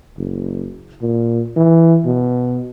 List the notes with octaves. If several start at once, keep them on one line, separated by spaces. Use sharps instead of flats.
F#1
A#2
E3
B2